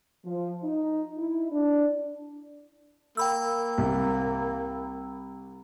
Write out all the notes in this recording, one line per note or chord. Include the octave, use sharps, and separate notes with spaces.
F3
D#4
E4
D4
A#3 G5 B5 E6
C2